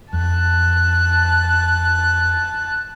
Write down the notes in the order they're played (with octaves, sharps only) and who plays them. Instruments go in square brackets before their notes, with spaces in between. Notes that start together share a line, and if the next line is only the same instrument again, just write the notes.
[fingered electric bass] F2 [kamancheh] A5 F#6